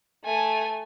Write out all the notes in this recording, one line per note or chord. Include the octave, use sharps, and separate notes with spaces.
A3 G#5